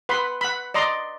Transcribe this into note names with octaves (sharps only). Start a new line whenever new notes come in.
B4 F#5 B5 C6
F#5 B5
D5 D#5 A#5 C6